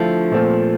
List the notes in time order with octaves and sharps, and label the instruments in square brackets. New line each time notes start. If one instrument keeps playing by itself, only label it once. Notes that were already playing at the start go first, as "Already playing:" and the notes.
Already playing: [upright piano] D3 A3 E4 [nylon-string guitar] F3
[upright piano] A#2 A3 C4 F4